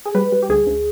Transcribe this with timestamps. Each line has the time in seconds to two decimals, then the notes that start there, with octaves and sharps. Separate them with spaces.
0.06 G#4
0.15 G3 B4
0.32 G3
0.42 G4
0.49 D2 G#4
0.67 D2